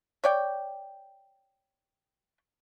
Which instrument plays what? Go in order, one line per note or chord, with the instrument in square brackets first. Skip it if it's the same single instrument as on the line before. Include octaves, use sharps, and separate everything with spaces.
[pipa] C#5 D5 G5